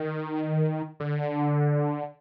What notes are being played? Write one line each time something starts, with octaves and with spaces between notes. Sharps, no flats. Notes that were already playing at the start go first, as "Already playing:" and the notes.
Already playing: D#3
D3